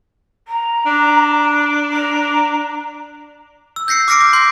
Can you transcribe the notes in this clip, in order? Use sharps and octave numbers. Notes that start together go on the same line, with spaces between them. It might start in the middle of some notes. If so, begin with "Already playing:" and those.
A#5
D4
A#5
E6
G6 A#6 C7 C#7
D6 F6 A#6 C#7 D7
D6
C6 G6 C7